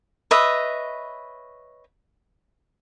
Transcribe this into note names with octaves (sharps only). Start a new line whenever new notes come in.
B4 C#5 D#5 E5